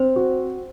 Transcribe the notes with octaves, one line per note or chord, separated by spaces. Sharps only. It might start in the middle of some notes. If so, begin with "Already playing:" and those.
Already playing: C4 C5
F#4